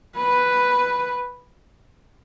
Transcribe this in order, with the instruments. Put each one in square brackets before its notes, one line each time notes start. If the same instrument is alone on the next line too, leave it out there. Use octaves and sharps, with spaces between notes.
[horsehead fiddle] B4